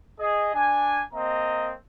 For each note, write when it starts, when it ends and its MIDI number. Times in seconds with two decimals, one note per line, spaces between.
0.20 0.51 68
0.20 0.51 75
0.54 1.01 62
0.54 1.01 80
1.14 1.73 58
1.14 1.73 60
1.14 1.73 75
1.14 1.73 82